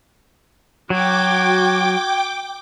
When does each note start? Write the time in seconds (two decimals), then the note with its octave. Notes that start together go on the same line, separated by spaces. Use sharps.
0.90 F#3 F#4 G5 D6 G#6